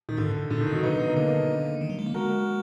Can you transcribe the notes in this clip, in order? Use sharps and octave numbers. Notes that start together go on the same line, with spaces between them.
A#2 D#3
G#2 D3
A#2 D3
D#3
B2
D#3 F#3
D3 B3 D#4
B2
D#4
D3 A#3 D4
A#3 D4
D#3
F#3
G#3
A#3
G#3 F#4 A#4